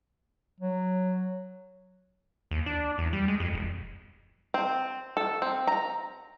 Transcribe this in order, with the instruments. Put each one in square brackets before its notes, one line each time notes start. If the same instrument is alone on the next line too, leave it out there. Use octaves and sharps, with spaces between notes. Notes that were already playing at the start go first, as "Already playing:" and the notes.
[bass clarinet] F#3
[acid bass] D#2
D4
E2
G3
G#3
F2
E1
[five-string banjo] C4
A4
C4
A#5